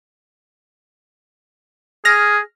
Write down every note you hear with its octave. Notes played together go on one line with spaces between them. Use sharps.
G#4 F6 A#6